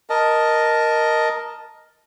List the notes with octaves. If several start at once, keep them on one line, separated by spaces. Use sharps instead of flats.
A#4 D#5 A5